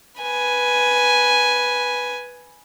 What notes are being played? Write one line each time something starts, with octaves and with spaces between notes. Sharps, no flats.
B4 G#5